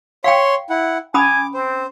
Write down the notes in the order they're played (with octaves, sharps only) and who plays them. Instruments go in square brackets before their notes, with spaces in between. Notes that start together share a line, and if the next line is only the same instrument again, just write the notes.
[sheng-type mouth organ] C#5 C6 [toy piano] F5 G5
[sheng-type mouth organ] E4 F#5
[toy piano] C#4 B5 D#6 [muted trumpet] G#5 [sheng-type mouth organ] D6
[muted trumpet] C4 [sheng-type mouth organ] C5